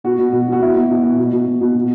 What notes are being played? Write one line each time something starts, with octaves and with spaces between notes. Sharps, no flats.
B2 F#4
B2
B2
B2
F#4
B2 E4
B2
B2
B2
B2
B2
B2
B2
B2